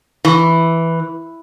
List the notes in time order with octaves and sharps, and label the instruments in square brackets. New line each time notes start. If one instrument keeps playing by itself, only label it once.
[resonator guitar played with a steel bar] E3